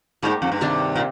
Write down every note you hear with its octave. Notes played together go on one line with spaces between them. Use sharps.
G#2 G3 A#3 D#4 G4
F2
G2
C3 D#3 G3 D4
A#2